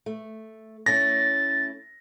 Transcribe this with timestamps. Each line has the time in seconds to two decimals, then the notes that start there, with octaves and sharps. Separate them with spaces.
0.06 A3
0.86 A3 C#4 E4 A6 A#6